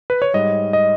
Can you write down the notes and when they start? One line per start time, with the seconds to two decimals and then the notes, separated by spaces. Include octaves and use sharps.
0.10 B4
0.22 C#5
0.34 G#2 G3 D#5
0.73 D#5